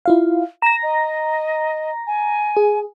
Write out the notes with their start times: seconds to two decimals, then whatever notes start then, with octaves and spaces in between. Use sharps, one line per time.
0.06 E4 F4 F5
0.62 A#5 A#6 E7
0.83 D#5
2.07 G#5
2.57 G#4